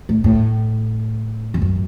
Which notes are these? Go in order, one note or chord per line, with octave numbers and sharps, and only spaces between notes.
A2
A2
E2
F#2